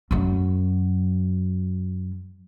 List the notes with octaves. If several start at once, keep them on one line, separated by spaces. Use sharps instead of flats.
F#2 F#3